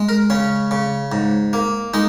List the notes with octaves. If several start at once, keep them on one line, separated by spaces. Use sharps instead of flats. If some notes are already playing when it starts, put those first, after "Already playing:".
Already playing: G#3
A#4
C#3 C#4
C#3
G#2
A#3
G#3 D#4